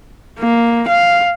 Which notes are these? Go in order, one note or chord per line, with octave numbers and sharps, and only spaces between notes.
A#3
F5